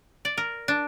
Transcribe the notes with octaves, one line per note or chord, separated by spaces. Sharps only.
D5
A#4
D4